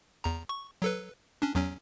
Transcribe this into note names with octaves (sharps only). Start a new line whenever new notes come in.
E2 A#5
C#6
F#3 A4 B4
C#4 D4
E2 F#3 C#4